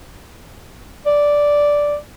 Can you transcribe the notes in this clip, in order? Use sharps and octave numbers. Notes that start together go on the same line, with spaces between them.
D5